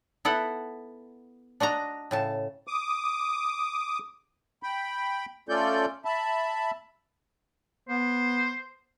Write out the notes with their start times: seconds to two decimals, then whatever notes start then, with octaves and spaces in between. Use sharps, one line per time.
0.25 B3 E4 A4 F#5
1.60 D4 F#4 D#5 A#5
2.11 A2 C#3 A5
2.67 D6 D#6
4.63 G5 B5
5.49 A3 C#4 F4 A4 D5 G6
6.05 E5 A5 B5
7.89 B3 C5